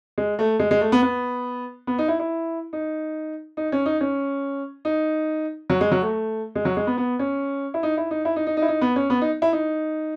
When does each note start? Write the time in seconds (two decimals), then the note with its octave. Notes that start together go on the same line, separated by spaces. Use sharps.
0.18 G#3
0.39 A3
0.59 G#3
0.71 G#3
0.81 A3
0.92 B3
1.03 B3
1.87 B3
1.98 D#4
2.08 E4
2.20 E4
2.73 D#4
3.57 D#4
3.72 C#4
3.86 D#4
4.01 C#4
4.85 D#4
5.70 F#3
5.81 G#3
5.91 F#3
6.02 A3
6.55 G#3
6.65 F#3
6.77 G#3
6.87 B3
6.98 B3
7.19 C#4
7.74 E4
7.83 D#4
7.97 E4
8.11 D#4
8.25 E4
8.36 D#4
8.47 D#4
8.57 D#4
8.62 E4
8.68 D#4
8.81 B3
8.96 C#4
9.10 B3
9.21 D#4
9.42 E4
9.53 D#4